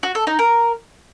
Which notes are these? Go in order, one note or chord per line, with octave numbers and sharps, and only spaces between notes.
F#4
A4
D#4
A#4